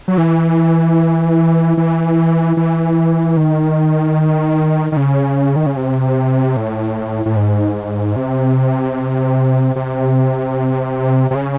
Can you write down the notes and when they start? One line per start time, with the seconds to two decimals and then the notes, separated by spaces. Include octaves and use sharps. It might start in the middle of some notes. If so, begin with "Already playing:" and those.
0.08 F#3
0.18 E3
1.77 E3
2.57 E3
3.37 D#3
4.92 D#3
4.97 C#3
5.56 D#3
5.66 C#3
5.77 C3
6.57 A2
7.26 A2
7.36 G#2
8.16 C3
9.76 C3
11.31 C3
11.35 C#3